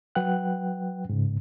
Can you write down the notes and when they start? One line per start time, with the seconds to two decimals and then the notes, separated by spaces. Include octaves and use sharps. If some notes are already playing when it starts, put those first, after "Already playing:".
0.15 F#3 B4 F#5 G5 F#6
1.09 G#2 C#3